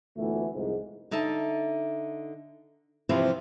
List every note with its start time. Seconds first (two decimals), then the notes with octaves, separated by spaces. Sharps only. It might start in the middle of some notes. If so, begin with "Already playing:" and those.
0.17 D2 A#2 E3 A3 B3
0.52 C2 F2 G#2
1.11 D3 D#4 E5 A5
3.09 C3 E3 F3 C4 E4 A5